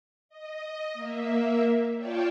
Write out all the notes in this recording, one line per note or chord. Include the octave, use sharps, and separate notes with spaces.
D#5
A#3 E5
F4 C#5 D5 G5 A5